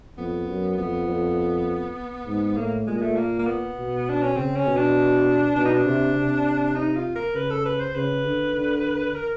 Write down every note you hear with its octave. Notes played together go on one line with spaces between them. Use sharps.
F2 B3
F#2
F2 B3
F2
G#2
A2 A#3
A#2 G#3
G#3
A3
A#3
A#3
B3
B2
D4
C#4
C#3 C4
C#4
B2
D4
B2 D4
D#4
D4
C3
C3
D#4
F4
A#4
C#3 B4
A4
B4
C5
C#3 B4
D3
D3
A#4